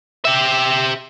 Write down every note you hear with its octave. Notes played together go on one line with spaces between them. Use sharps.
G4 E5